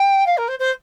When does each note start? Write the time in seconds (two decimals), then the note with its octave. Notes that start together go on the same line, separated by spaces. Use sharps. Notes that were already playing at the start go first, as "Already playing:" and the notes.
Already playing: G5
0.26 F5
0.37 A#4
0.48 C5
0.59 C5